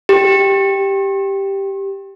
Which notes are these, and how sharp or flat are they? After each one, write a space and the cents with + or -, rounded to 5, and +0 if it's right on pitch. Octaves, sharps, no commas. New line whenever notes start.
G4 +0